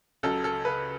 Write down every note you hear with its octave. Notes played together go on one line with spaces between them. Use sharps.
C#2 C#3 F#3 A4
A4
B4